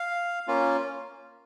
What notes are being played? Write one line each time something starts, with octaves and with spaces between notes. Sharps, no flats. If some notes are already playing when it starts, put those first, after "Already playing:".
Already playing: F5
A#3 C#4 F4